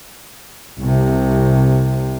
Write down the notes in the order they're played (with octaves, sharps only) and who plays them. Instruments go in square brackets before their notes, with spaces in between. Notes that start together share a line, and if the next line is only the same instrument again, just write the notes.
[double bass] C2 C3